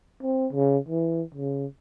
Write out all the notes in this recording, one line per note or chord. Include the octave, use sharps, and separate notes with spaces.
C4
C#3
E3
C#3